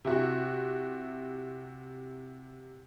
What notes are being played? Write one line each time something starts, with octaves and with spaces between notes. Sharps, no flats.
C3 E4 F#4